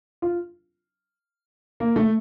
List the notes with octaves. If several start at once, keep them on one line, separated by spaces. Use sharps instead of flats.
F4
A#3
A3